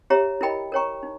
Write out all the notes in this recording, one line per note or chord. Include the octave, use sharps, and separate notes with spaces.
G4 C#5 E5 A#5
E4 A#4 D#5 G5 B5
A#4 C#5 G5 A#5 C#6
D#4